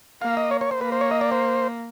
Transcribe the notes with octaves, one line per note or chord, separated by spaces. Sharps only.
A#3 F5
D#5
C#5
C#5
C5
A#3 B4
C5
C#5
D#5
D5
C5